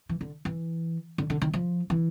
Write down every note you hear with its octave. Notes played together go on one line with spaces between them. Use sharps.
E3
D3
E3
D3
D3
D#3
F3
E3